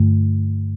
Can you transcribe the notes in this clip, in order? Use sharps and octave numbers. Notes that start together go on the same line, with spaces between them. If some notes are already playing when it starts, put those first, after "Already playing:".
Already playing: G2 D3 A3